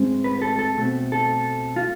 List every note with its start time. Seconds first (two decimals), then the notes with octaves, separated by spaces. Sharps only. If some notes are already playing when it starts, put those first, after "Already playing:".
Already playing: A2 G#3 C4
0.24 B4
0.42 A4
0.59 A4
0.77 B2 A3 C4
1.12 A4
1.76 F4